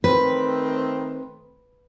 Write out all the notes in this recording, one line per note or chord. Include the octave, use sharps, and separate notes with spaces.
D#3 A3 C4 B4